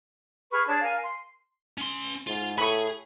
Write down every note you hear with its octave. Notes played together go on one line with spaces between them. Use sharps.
G#4 B4 C#6 F6
D4 G#4 C#5 A5
A#4 F5 G#5
C6
C#4 C6
G#2 F4
A2 G#4 B5 C#6